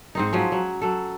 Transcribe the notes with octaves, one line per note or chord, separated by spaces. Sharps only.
G#2 C4 D#4
F3 F#3 C#4
F#3
F#3 A4